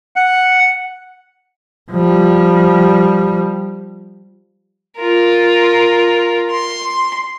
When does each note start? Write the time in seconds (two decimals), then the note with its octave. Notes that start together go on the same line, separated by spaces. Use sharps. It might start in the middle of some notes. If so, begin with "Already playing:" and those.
0.16 F#5
1.91 F3 G3
4.98 F4 A#4
6.50 C6